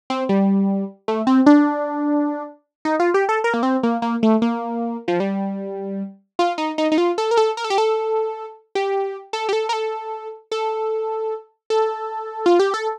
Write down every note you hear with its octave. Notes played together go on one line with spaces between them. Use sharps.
C4
G3
A3
C4
D4
D#4
F4
G4
A4
A#4
A#3
C4
A#3
A#3
A3
A#3
F3
G3
F4
D#4
D#4
D#4
F4
A4
A#4
A4
A#4
A4
G4
A4
G4
A4
G4
A4
A#4
A4
A4
A4
F4
G4
A4